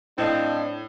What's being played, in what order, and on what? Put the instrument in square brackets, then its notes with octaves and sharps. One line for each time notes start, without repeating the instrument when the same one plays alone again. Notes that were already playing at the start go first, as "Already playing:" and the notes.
[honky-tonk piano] A2 [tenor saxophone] C4 [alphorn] D4 [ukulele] A4 D#5 F5